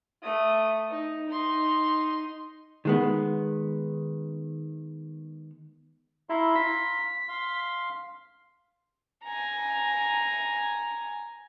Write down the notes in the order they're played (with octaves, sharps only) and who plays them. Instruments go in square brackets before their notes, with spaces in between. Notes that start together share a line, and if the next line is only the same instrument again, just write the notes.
[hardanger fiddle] A3 D#6
D#4
D#4 C6
[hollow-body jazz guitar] D#3 G#3 B3
[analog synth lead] E4 [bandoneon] F5 A#5 C6
[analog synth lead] B6
[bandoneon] F5 C6
[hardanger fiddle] G#5 A#5